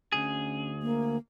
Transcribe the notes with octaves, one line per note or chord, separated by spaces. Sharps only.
D2 G#2 C#4 G#4
A#3